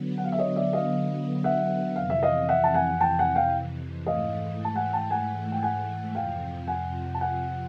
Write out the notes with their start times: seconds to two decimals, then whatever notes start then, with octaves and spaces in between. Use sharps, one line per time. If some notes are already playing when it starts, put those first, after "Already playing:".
Already playing: D3 F#3 B3
0.18 F#5
0.24 F5
0.32 E5
0.39 C#5 D#5
0.56 D5 E5
0.73 D#5 F5
1.44 E5 F#5
1.96 F2 C3 E3 F5
2.10 E5
2.23 D#5 F5
2.49 E5 F#5
2.64 A5
2.74 F#5 G#5
3.01 G5 A5
3.19 F#5 G#5
3.36 F5 G5
4.06 G#2 E3 A3 D#5 F5
4.65 A5
4.75 F#5 G#5
4.93 G5 A5
5.11 F#5 G#5
5.52 G5
5.63 F#5 G#5
6.15 F2 C3 F3 F5 G5
6.67 F#5 G#5
7.15 A5
7.21 F#5 G#5